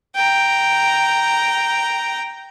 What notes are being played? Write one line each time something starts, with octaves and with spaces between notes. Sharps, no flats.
G5 A#5